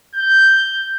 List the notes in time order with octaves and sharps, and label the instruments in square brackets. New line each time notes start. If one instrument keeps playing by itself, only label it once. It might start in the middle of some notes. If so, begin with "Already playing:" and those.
[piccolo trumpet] G6